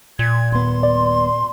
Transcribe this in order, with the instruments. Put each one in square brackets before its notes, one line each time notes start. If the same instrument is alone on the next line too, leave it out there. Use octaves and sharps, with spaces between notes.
[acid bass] A#2 [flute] G#6
[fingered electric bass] D#1 B3 [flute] C6
[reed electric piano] D5